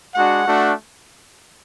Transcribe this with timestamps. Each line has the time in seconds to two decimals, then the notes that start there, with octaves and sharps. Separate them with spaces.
0.15 G#3 D4 F#4 F#5
0.47 A3 D4 F#4